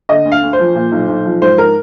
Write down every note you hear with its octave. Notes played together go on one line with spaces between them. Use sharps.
D3 D#5
D2
F5
D2
C5
F3
A#2
B1
B1
F3
G#2 C5
A#4